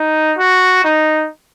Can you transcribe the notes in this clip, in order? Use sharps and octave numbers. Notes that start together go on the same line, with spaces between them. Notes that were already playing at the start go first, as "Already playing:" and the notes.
Already playing: D#4
F#4
D#4